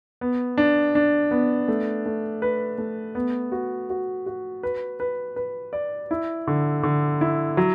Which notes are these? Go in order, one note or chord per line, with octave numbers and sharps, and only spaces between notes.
B3
D4
D4
B3
A3
A3
B4
A3
B3
F#4
F#4
F#4
B4
B4
B4
D5
E4
D3
D3
E4
F#3